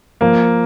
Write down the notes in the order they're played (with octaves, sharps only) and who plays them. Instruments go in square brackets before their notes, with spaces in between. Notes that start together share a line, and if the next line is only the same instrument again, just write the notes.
[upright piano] F3 [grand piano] A#3